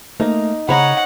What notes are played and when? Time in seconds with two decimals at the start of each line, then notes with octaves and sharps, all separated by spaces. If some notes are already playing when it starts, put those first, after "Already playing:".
0.20 A3 A#3 D#4
0.69 C#3 C5 C#5 D#5 F#5 A#5 B5